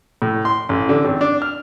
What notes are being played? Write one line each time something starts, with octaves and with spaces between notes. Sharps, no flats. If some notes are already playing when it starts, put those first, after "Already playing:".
A2
C6
A1
D3
G#1
D4
F6